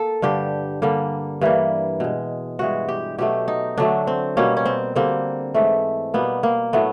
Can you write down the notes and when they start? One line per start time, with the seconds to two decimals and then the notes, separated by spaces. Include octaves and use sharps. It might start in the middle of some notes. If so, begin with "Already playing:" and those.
Already playing: A#3 A4
0.22 G2 D3 G3 G4
0.82 D3 G3 A#3
1.41 G2 E3 G3 A#3
2.00 B2 G#3
2.59 G2 E3 G#3 F#4
2.89 G4
3.18 B2 F#3 A3 G4
3.48 D#4
3.77 D3 F#3 A3 D4
4.07 C4
4.37 B2 G3 A#3 C#4
4.57 C#4
4.66 C4
4.96 D3 G3 A#3 C4
5.54 G#2 E3 A3
6.14 B2 G3 A#3 B3
6.43 A#3
6.73 A2 F#3 A3 B3